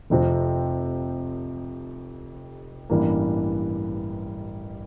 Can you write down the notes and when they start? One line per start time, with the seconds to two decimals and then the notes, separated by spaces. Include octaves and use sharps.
0.10 F1 F2 C3 F3 C4
2.90 A1 G2 E3 A#3